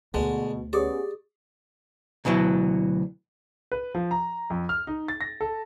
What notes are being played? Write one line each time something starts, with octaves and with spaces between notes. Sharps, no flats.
D2 B2 D3 G#3
B3 C#4 G4 G#4 D5 D#6
D2 B2 E3 F#3
B4
F3
A#5
F2
F6
D#4
A6
A#6
A4